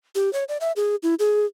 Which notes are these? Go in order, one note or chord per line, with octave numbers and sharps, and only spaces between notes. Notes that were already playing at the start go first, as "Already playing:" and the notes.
G4
C#5
D5
E5
G#4
E4
G#4